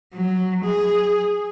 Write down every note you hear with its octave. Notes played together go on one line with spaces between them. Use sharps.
F#3
G#4